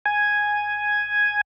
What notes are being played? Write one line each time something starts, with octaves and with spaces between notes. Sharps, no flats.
G#5